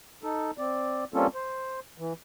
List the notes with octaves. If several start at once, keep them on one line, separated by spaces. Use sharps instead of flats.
D#4 A4
C4 D5
G3 A#3 C4 C#4 F4 A4
C5
E3